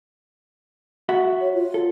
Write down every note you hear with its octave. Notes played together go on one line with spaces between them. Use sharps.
F#4 E5 F#5
C#5
F4
A4